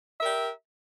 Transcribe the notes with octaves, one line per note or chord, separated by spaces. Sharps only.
G4 A#4 E5